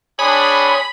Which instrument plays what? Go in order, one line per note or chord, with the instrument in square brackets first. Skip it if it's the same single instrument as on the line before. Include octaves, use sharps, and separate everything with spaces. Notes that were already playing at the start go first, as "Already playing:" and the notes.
[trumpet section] C4 D4 G#4 [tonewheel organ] C#5 G#5 D#6 [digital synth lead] B5